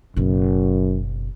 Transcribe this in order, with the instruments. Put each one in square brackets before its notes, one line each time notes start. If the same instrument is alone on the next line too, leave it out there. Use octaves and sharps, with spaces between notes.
[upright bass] F#1 B2 [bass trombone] F#2